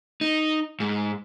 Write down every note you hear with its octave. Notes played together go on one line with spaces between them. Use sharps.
D#4
G#2